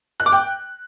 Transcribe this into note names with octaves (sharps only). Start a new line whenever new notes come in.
F#6
D6
G5